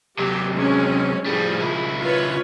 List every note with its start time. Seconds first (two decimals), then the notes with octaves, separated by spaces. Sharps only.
0.19 C3 F#3 G4
0.54 G#3 C4 C#4
1.26 A2 F3 G3 G#4
1.61 C#2 E4
2.00 F4 B4 C#5